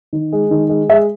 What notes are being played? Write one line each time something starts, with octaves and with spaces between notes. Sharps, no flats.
D#3
G#3
D#3
G#3
G#3 E5